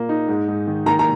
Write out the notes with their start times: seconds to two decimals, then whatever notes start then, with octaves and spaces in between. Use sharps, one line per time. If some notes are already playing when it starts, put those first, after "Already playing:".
Already playing: A#2 A#3
0.09 D#4
0.28 G#2
0.48 G#2
0.67 D#3
0.86 D#3 A#5
0.99 A#5